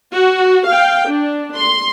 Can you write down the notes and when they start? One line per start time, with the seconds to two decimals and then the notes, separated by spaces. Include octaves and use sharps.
0.13 F#4
0.67 F5 G5
1.09 D4
1.55 C6